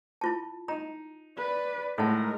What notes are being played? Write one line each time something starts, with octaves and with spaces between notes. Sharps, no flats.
E4 F4 A5
D#4 A#5
B4 D5
A2 G#3 D#4 A#4 F#5 A5